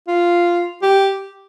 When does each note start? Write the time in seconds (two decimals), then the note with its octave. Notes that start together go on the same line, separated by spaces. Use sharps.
0.08 F4
0.82 G4